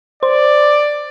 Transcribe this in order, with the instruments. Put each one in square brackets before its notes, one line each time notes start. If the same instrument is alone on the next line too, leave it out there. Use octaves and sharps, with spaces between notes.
[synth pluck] C5 [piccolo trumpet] D5